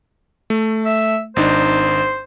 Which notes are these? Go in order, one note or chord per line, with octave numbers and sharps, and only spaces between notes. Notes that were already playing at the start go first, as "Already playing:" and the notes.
A3
E5
G#1 D4 D#4 C5